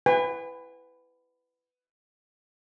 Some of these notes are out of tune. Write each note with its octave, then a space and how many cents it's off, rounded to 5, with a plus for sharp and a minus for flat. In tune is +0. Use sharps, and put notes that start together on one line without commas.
B4 +15 G#5 -35